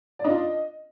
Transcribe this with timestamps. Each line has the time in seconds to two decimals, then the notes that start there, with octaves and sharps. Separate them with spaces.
0.19 D5
0.24 D4 F4 D#5